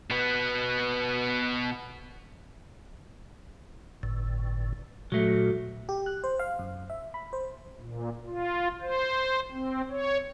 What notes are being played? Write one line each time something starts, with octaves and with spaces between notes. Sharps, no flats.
B2 B3
G1 A2
A#2 F#3 A3
G4
F#6
C5
F5
F#2
E5
B5
C5
A#2
F4
C5
C4
C#5